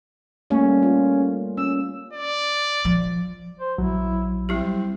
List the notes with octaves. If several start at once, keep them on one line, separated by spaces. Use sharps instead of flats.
G3 A3 A#3 C#4
F4
C#4 E6
D5
F3
C5
A#1 F#3 E4
G3 C4 E4 G4